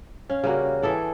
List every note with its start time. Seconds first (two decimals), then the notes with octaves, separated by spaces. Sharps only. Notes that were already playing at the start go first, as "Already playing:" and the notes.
0.30 C#4 F5
0.44 C#3 G3 A#3 F#4
0.82 E3 G#4 A4 D5